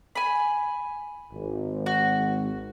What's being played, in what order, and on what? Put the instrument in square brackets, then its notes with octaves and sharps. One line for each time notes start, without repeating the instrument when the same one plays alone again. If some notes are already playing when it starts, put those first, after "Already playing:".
[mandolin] G#5 B5
[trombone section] G#1
[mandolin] F#4